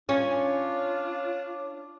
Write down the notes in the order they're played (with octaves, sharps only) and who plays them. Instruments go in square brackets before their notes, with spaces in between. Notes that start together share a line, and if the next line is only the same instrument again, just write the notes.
[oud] C#4 [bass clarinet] D4 [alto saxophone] F4 [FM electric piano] C#5